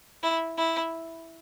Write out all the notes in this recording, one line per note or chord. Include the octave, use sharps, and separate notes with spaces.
E4
E4